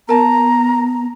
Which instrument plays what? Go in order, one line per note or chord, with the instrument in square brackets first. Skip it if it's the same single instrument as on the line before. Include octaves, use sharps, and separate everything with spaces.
[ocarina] B3 [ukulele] A#4 A5 [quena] A#5